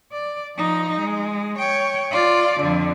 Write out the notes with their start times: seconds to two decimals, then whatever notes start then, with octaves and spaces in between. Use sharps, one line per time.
0.12 D5
0.56 F3 D#4
1.00 G#3
1.59 C#5 G5
2.11 F4 D5
2.61 F2 D3